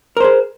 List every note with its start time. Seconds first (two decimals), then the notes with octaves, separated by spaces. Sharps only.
0.17 A#4
0.20 C5
0.24 G#4